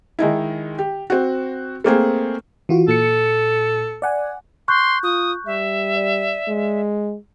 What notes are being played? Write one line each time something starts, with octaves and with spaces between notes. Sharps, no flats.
D#3 G#3 D#4 E4
G4
C4 F#4
A3 A#3 C4 G#4
E3 F4 F#4
A#2 A4 C#7
D5 F#5 G#5
C6 C#6 F#6 G6
F4 D#6
G3 E5
D5
G#3